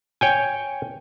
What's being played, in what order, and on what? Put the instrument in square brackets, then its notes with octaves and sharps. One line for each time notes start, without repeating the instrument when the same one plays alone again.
[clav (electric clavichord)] C#5 G5 G#5